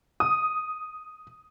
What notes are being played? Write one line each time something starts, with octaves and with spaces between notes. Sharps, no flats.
D#6